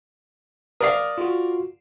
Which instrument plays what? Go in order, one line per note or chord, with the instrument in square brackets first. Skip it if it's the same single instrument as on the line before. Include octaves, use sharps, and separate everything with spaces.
[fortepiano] A#4 D5 F5 [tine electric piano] D#6
[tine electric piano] F4 F#4